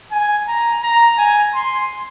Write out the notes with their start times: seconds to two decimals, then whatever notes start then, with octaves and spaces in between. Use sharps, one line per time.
0.12 G#5
0.48 A#5
0.83 A#5
1.18 G#5
1.54 C6